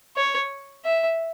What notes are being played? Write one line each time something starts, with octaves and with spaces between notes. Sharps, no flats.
C#5
E5